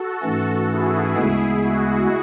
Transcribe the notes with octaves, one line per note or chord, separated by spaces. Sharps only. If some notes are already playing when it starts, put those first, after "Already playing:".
Already playing: F#4 A4
G#2 E3 A3 C#4
E4 G#4
D2 C#3 G#3 B3
F#4